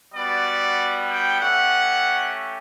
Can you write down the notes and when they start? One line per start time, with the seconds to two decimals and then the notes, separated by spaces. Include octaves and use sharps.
0.14 G3 B3 F#4 D5
1.10 G5
1.41 A3 C#4 G4 F#5